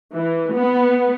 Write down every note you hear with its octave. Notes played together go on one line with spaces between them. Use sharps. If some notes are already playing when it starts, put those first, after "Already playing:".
E3
B3